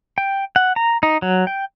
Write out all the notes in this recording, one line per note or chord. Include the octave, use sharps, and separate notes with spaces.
G5
F#5
A#5
D#4
F#3
G5